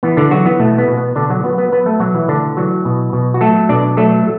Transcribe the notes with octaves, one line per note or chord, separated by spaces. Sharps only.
E3 B3
D3 D4
E3 F#3 F#4
B3
B2 A3
B3
B2
B3
B2 D3 D4
F#3 F#4
F#3 B3 B4
B3 B4
F#3 B3 B4
A3 A4
B2 F#3 F#4
E3 E4
A2 D3 D4
E3 F#3 F#4
B2
B2
F#4
F#3 A3 A4
B2 D4 D5
F#3 A3 A4